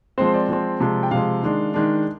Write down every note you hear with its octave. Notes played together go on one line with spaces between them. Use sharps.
F3 G#3 C4 C5
D5
F3 G#3 C4
C3 F3 G#3
G5
C3 F3 G#3 F5
D#3 G#3 D4
D#3 G#3 D4